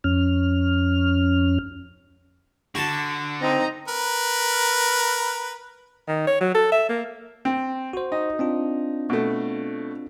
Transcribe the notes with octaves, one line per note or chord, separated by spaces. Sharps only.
F2 C#4 F6
D3 F#4 A5
C4 D#4 A#5
A#4 B4
D#3
C#5
F#3
A4
E5
A#3
C4
F#4 C5
D#4
C4 D4 F4
B2 A3